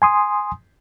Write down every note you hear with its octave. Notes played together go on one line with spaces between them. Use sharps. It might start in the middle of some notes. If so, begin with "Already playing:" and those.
G#5 C6 D#6